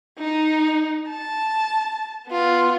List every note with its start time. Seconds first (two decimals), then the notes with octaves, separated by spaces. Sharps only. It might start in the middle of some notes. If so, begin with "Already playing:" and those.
0.19 D#4
1.09 A5
2.28 B3 F4